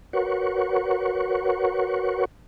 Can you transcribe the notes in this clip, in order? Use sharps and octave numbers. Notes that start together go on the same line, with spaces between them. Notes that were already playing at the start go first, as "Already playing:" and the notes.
F#4 A#4 B4 C#5 F#5 C#6